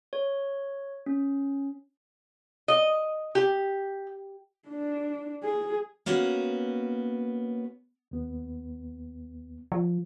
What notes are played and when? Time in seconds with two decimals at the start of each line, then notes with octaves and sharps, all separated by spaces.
0.13 C#5
1.06 C#4
2.68 D#5
3.35 G4
4.68 D4
5.44 G#4
6.06 A#3 B3 C#4 F#4
8.11 D#2 B3
9.72 F3